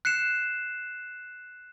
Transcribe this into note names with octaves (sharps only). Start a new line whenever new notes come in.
F#6 C7 C#7 E7